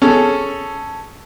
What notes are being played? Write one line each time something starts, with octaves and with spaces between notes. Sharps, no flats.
C#4 G#4 A4